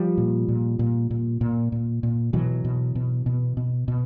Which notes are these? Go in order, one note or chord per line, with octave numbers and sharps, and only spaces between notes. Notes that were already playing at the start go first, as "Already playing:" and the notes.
Already playing: F3 G3
A#2
A#2
A#2
A#2
A#2
A#2
A#2
B2 E3 F#3
B2
B2
B2
B2
B2